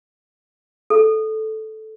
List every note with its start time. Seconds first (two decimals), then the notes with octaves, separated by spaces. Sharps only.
0.90 A4